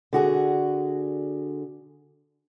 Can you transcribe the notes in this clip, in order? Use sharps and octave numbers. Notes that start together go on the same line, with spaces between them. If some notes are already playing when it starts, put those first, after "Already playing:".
D3 F#4 G#4